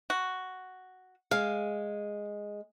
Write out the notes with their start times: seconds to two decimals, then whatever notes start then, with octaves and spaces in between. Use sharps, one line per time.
0.10 F#4
1.31 G#3 F5